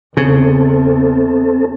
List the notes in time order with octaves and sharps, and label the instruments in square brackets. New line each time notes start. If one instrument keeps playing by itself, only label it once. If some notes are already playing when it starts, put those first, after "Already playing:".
[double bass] E2 [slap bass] C#3 [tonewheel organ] C4 A4